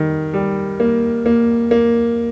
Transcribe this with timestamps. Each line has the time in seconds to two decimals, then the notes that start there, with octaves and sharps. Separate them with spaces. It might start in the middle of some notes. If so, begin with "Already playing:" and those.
Already playing: D#3 G3
0.34 G3
0.80 A#3
1.26 A#3
1.71 A#3